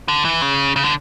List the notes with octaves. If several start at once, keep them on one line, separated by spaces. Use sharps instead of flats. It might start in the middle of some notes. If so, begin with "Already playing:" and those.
D3
E3
C#3
C#3
D3